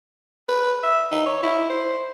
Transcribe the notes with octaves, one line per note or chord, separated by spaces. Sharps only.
B4
E5
D#4
C#5
E4
C5